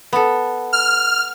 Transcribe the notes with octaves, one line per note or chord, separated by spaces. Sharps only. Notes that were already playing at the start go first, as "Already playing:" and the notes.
B3 A4
F6